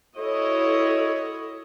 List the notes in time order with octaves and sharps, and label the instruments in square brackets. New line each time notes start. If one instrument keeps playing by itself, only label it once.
[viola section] E4 F#4 D#5 [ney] A4 [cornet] C#5